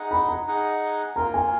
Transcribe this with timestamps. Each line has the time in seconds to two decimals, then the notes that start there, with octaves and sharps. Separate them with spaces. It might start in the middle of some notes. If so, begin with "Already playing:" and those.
Already playing: D#4 G#4 D#5 F#5
0.11 B5
0.29 A#5
0.46 D#4 G#4 D#5 F#5
1.16 A#3 F4 A#4 A#5
1.34 G#5